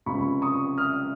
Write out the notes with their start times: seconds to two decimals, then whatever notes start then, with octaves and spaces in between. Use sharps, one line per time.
0.06 C#2 C3 F3 B5 C#6
0.42 C#6 D#6
0.78 D#6 F6